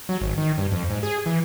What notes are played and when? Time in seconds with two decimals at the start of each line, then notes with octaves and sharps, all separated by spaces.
0.09 F#3
0.21 G#1
0.38 D#3
0.58 G2
0.72 F2
0.90 G#2
1.03 G#4
1.26 E3